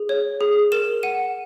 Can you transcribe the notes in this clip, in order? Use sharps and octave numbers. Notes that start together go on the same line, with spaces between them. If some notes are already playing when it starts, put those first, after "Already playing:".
Already playing: G#4
C#5
G#4
A#4 E7
F#5 D#7